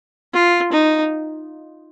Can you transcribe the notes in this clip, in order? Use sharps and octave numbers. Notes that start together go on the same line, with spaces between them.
F4
D#4